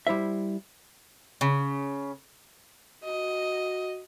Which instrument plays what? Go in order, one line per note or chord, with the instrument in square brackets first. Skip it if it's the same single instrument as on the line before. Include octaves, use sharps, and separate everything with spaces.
[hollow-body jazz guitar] G3 E4 C5 E5
[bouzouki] C#3
[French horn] F#4 [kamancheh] D#5